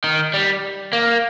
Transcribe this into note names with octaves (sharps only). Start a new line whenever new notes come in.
D#3
G3
A#3